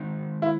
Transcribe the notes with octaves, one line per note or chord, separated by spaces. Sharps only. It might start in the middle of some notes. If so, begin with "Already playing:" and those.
Already playing: D#3 G#3 C4 D#4
E4